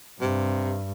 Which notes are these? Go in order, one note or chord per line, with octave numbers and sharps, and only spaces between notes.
G2 C3